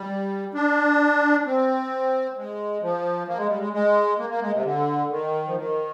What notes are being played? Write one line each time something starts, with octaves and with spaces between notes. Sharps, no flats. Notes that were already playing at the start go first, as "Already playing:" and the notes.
Already playing: G3
D4
C4
G#3
F3
A#3
G#3
G3
G#3
G#3
A#3
A#3
G#3
C3
D3
D#3
F3
D#3